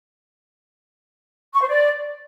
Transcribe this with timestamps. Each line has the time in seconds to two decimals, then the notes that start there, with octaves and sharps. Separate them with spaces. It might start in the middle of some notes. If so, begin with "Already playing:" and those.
1.54 C#6
1.61 C5
1.69 D5